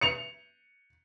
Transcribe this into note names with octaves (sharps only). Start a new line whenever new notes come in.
C#7 F7